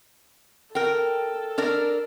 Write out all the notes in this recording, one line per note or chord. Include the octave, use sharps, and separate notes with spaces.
A4 A#4 G5
D4 A#4 D5